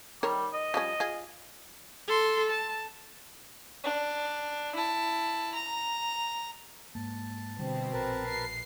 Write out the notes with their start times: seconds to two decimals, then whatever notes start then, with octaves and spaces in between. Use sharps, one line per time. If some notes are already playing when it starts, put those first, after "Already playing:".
0.23 D#3 G3 A#4 C#5
0.53 D#5
0.74 F3 G3 C#4
1.00 F4 G#4
2.07 A4 C6
2.50 A5
3.84 D4
4.75 E4 A5
5.54 A#5
6.95 G#2 A#3 A5
7.59 B2 D3 G3 C4
7.93 A#1 A#4 B4 A5
8.29 C7